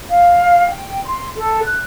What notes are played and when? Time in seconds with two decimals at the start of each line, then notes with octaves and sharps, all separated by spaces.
0.09 F5
0.68 G5
1.05 C6
1.35 A4
1.62 F#6